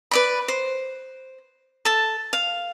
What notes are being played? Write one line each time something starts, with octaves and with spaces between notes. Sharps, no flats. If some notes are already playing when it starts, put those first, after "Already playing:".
B4 D5 B5
C5
A4 A5
F5